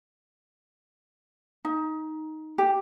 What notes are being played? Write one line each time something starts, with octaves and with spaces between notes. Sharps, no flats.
D#4
G4